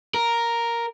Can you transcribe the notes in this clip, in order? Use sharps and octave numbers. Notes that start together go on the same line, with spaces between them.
A#4